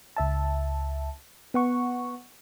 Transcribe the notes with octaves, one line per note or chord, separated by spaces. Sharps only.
C#2 E5 A5
B3 F#5 C#6